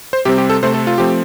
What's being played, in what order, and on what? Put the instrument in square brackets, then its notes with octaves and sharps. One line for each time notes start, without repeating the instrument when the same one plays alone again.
[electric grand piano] C5
C3 G3 C4 G4
G4
A4
C3 A3 C4 C5
A4
F4
F3 A3 C4 G4